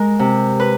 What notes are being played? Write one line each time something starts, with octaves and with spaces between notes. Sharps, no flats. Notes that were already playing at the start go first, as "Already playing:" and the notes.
Already playing: G#3 A#4
C3
B4